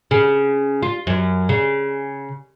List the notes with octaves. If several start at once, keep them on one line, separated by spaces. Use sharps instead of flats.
C#3
F4
F#2
C#3